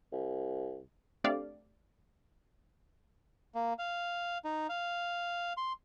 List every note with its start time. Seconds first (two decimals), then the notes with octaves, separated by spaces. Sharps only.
0.12 C2
1.24 A3 C4 D4 G4 D5 F5
3.54 A#3
3.79 F5
4.45 D#4
4.69 F5
5.57 C6